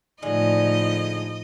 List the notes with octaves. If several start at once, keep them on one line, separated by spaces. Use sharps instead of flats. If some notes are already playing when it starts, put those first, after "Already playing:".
A2 D3 F3 G#3 D#4 D#5